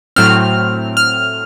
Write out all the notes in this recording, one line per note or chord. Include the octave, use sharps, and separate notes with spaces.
A2 F#3 A3 C4 F6
F6